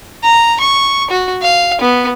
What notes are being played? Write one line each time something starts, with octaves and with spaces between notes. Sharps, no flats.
A#5
C#6
F#4
F5
B3